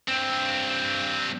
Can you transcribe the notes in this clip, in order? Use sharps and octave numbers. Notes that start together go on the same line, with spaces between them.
G2 C4